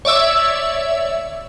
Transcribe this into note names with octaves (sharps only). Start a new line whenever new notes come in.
C#5 D5 E5 E6